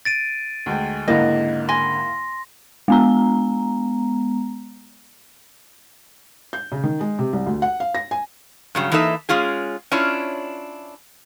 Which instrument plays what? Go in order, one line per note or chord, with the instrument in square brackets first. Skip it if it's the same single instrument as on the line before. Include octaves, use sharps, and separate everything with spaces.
[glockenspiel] A6 D7 D#7
[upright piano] D2 G#3 G5
[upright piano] C#2 G#2 D3 [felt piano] A#3 E4 [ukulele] D#5
[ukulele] G#5 [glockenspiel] C6 A#6
[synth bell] G#3 B3 A#5
[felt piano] G6
C#3
D#3
G#3
C3
C2
D2
F#5
F5
A#6
G#5
[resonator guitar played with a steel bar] G2 C#3 F#3
E3 A#3 D#4 A4 E5
G#3 C#4 F4 G#4
C#4 D4 E4 F4 C#5